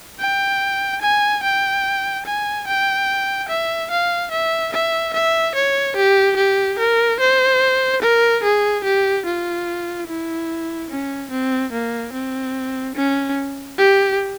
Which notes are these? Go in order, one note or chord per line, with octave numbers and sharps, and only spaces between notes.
G5
G#5
G5
G#5
G5
E5
F5
E5
E5
E5
C#5
G4
G4
A#4
C5
A#4
G#4
G4
F4
E4
C#4
C4
A#3
C4
C#4
G4